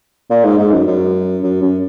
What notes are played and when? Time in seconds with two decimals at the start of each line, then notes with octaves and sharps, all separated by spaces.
0.30 A#2
0.44 G#2
0.58 G#2
0.72 F#2
0.87 F#2
1.43 F#2
1.62 F#2